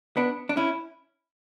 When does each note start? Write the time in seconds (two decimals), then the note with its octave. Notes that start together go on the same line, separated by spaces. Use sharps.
0.17 B3 D4
0.49 D4
0.57 C#4 E4